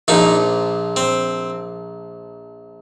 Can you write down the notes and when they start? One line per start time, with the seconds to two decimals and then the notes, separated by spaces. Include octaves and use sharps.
0.08 A#1 A#2 F3 D#4
0.96 C4